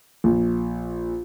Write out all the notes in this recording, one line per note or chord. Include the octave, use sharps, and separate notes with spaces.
A#1